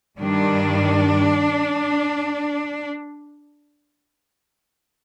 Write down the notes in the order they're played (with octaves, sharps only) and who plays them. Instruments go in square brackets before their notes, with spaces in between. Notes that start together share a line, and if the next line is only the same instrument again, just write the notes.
[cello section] G2 D#3 G3 D4